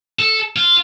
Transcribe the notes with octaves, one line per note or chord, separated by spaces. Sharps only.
A4
F4